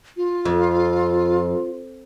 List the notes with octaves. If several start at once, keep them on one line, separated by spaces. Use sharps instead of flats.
F4
F2